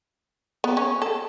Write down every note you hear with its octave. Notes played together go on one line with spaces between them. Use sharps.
B3
C#4
A4